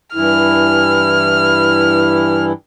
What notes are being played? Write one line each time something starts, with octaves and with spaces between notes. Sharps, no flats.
G2 E3 E4 F6